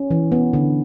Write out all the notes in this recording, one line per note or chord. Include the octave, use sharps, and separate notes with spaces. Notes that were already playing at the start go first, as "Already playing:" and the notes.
Already playing: C#4
E3
B3
D3